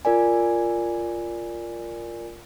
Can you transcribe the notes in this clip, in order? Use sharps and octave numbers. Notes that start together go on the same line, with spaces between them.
F4 A#4 D5 G#5